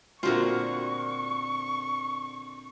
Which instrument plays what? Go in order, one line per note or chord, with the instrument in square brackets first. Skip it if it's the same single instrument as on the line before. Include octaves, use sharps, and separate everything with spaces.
[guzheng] A#2 D3 C4 [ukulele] F4 F#4 A#4 [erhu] C#6